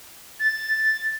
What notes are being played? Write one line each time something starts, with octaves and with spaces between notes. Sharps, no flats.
A6